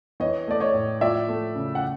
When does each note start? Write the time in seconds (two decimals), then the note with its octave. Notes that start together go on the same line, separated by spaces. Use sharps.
0.20 E3 C#5 D#5
0.48 A3 D5
0.60 C#5 D#5
0.74 A2
1.01 F3 D5 E5
1.29 A3
1.55 C#3
1.75 F#5